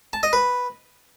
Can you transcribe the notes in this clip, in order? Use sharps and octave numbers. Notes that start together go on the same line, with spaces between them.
A5
D#5
B4